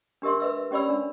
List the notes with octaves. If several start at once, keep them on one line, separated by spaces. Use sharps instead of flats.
D4 G4 A#4 E5 C6
B4 E5 E6
E5
C#4 G4 C#5 D5 B5 E6
D4